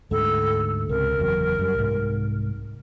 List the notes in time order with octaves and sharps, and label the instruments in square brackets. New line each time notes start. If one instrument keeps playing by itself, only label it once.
[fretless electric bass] D2 G#2 A3 [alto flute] A4
[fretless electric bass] C#2 C3 [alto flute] A#4
[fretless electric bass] F#1 E2 F#3
F#2 G3
C2 G#2